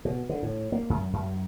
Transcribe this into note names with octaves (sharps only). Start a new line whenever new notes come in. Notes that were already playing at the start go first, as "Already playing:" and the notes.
B2
D3
A2
A#3
F#2
F#2